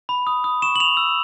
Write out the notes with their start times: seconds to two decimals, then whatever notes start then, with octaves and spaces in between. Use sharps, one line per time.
0.09 B5
0.27 D#6
0.44 D#6
0.62 C#6 E7
0.76 F#7
0.80 C#6 F7
0.97 E6